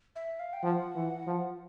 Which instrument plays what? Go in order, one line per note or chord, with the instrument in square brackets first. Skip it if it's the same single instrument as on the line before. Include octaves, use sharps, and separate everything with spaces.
[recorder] E5
F5
G5
[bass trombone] F3 [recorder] F#5
[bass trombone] E3
F3